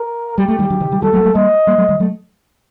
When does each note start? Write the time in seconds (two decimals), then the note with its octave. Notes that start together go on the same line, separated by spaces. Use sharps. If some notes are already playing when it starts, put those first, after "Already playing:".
Already playing: A#4
0.38 G3 G4
0.48 A3
0.59 D#3 G3
0.70 D3 F#3
0.80 C3 D#3
0.91 D#3 G3
1.02 D#3 G3 A4
1.13 F#3 A3
1.20 A#3
1.24 F#3 A3
1.35 G3 A#3 D#5
1.67 G3 A#3
1.78 F#3 A3
1.89 D#3 G3
2.00 F#3 A3